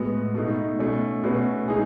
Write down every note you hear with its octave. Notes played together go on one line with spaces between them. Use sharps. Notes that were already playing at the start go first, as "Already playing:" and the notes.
Already playing: A2 G#3 B3 F#4
B2 A3 D#4
B2 A3 C#4
B2 A3 C#4 F#4 B4
G#3 D#4 G#4